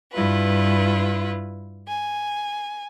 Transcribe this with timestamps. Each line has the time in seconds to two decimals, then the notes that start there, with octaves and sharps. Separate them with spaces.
0.12 G2 E4 F4 B4
1.87 G#5